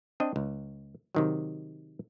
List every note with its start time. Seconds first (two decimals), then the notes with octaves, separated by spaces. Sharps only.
0.20 C4 D4 D#5
0.36 C#2
1.15 C3 D#3 F#3